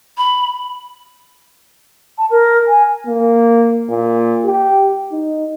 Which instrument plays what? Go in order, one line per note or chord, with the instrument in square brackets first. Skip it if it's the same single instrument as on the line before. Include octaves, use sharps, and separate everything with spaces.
[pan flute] B5
[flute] A5
A#4
G#5
[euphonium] A#3
A#2
G4
D#4